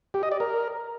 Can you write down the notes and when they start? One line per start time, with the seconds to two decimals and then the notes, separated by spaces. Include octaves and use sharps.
0.14 G4
0.23 D#5
0.32 D5
0.40 A#4